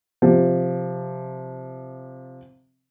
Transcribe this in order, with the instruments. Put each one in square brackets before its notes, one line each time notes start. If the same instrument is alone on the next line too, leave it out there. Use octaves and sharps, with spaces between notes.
[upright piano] C3 F3